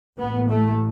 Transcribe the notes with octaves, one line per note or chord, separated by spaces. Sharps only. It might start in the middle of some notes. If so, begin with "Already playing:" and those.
A1 A2 B3
A3